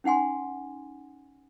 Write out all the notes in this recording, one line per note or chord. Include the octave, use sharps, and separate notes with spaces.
C#4 D#4 F#5 G#5 C6